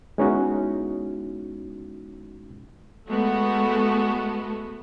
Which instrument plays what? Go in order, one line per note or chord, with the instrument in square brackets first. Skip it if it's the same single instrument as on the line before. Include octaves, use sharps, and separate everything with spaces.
[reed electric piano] G#3 B3 C#4 D#4 E4 F#4
[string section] G#3 A3 B3 F#4 A4